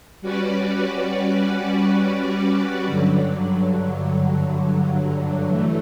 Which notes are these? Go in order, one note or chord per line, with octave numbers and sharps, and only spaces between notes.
G3 C#4 F#4 B4 D5
G2 D3 F#3
E3 A3